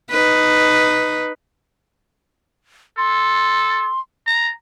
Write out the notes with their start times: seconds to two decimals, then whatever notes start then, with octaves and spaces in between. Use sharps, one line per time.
0.11 D#4 B4
2.98 A4 C6
4.27 A#5